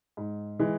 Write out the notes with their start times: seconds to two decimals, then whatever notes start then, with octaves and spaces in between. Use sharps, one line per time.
0.17 G#2
0.59 E3 G#3